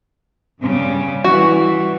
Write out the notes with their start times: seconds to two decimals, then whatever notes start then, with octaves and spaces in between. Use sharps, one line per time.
0.60 G2 C#3 G3
1.24 E3 G3 F#4